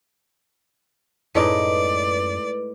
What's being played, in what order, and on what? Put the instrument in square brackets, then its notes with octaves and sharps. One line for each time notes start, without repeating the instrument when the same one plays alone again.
[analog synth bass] F#2 [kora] A2 G#3 D#4 [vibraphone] B4 [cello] D5